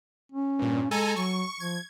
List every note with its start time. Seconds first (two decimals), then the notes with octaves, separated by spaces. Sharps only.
0.32 C#4
0.59 G2 A#2
0.91 G#3 A4 G#5 A#5
1.16 F#3 C#6
1.60 F3 G#6